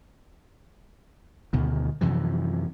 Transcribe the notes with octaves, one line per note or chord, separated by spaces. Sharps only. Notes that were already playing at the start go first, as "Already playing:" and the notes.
D2 B2 D#3
F#2 C3 E3 F3